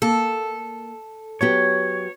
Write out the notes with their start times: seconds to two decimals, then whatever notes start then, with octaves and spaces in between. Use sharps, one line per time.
0.02 A#3 A4
1.41 F#3 B3 G4 C#5